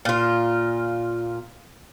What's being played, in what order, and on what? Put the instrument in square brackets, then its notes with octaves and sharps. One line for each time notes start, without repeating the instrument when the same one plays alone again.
[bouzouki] A#2 F4